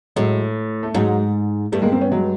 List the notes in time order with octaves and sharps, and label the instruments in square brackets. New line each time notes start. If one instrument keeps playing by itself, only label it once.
[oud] A2 [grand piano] F#3 G#3
[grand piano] A3
[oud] G#2 [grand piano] F#3 G#3
[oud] G2 [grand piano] G3 A3
[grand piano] G#3 A#3
A#3 C4
B3 C#4
F#3 G#3